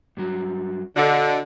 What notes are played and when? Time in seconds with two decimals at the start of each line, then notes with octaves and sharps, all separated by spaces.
0.17 G2 F#3 F#4
0.96 D3 F#4 D#5